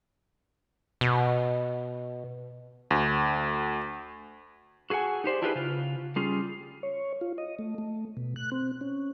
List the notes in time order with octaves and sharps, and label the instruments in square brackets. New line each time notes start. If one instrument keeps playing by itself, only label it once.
[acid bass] B2
[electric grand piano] D2
[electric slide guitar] F#4 G#4 A4 F#5 G#5
D#4 G4 C5 D5
D4 E4 F4 G4 G#4 B4
C#3 F4
G3 C#4 F4 G#4
[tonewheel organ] C#5
F4
D#5
A3
A3
B2
F#6
C4
C#4